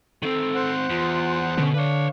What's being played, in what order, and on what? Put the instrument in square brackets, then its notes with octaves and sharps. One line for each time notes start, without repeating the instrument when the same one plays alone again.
[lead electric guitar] D#3 C4 [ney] A4
[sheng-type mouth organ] C5 F#5
[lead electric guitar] E2 [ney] F4
[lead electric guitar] B2 [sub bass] D3 [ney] C#4
[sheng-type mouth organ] D4 [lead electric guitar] B4 C#5 [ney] F5